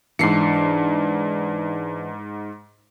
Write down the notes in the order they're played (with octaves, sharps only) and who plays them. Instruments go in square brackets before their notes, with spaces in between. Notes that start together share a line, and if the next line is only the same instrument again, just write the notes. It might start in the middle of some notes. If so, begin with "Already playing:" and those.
[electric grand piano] G#2 C7 C#7 [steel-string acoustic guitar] E3 D4